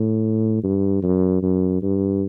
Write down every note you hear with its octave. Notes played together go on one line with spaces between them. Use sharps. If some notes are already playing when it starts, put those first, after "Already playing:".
Already playing: A2
G2
F#2
F#2
G2